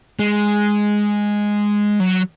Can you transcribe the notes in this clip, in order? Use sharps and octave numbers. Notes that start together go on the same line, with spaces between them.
G#3
F#3